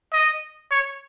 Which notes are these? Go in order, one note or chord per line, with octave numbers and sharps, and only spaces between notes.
D#5
C#5